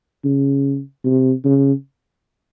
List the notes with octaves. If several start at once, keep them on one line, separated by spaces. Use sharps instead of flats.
C#3
C3
C#3